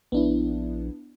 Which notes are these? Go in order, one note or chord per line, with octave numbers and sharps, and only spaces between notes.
A#1 B3 D4 E4